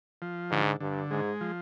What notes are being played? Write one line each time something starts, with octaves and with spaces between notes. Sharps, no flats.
F3
G#2 D3
G2 D3
G#2 G#3
F3